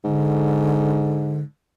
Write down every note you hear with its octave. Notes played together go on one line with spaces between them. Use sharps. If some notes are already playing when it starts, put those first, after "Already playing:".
G#2 D3